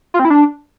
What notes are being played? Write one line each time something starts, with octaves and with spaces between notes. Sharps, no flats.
F4
C4
E4
D4